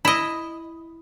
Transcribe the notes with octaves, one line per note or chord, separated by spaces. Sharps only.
E4 D#5